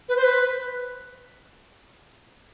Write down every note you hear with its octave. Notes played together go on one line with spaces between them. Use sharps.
B4
C5
B4